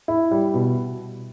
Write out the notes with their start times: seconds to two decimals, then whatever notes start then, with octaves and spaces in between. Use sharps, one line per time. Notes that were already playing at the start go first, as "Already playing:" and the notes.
0.08 E4
0.31 G3
0.54 B2